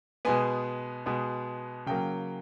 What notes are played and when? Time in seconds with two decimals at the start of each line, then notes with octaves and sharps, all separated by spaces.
0.25 B2 G#3 B3 G#5
1.06 B2 G#3 B3
1.86 C#3 F#3 A#3 G5